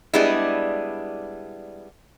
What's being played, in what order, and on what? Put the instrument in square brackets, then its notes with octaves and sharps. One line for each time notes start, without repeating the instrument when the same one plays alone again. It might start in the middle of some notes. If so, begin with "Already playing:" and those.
[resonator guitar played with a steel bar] G3 G#3 B3 D4 E4